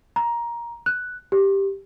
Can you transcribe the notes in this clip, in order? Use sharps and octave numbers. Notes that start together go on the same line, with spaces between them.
A#5
F#6
G4